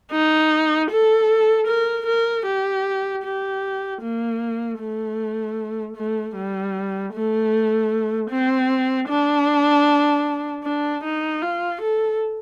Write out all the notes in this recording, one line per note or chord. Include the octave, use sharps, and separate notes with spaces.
D#4
A4
A#4
A#4
G4
G4
A#3
A3
A3
G3
A3
C4
D4
D4
D#4
F4
A4